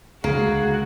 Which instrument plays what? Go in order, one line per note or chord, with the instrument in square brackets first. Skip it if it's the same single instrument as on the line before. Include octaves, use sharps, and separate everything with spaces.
[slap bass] C#2 D3 [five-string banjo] A#3 [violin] F#4 [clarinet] G#4